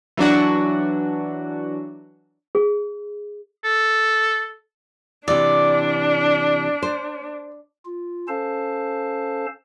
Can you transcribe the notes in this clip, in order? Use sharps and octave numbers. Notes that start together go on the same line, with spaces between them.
E3 F#3 D4 F#4
G#4
A4
C3 E3 D4 D5
C5
F4
C#4 A4 C5 F5 A5